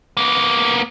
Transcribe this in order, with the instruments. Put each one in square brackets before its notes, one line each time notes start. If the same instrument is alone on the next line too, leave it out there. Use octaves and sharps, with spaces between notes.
[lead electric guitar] A#3 B3